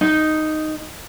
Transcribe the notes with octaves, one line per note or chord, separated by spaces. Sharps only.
D#4